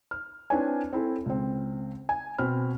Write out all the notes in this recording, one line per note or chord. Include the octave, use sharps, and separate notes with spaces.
F6
C4 D4 E4 B4 C#5 G#5
C4 E4 A4
C#2 C4
G#5
B2 C4 B5 F6